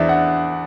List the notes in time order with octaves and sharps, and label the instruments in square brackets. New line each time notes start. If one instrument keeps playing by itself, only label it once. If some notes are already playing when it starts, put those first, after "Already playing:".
Already playing: [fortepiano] E2 [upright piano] C5 D5 E5
[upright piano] F#5